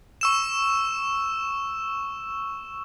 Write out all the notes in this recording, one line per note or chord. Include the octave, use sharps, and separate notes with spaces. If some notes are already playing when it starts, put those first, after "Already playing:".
C#6 E6 E7